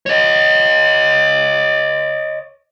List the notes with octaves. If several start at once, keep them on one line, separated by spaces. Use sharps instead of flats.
C#5 D#5